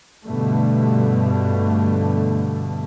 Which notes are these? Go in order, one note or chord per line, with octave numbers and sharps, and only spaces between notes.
G2 B2 D3 A3